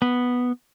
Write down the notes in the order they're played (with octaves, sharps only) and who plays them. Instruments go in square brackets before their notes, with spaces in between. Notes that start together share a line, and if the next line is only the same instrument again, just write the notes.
[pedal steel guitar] B3